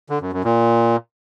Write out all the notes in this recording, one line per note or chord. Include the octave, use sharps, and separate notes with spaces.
D3
F#2
F#2
A#2